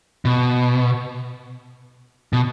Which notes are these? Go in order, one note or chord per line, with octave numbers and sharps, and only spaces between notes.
B2
B2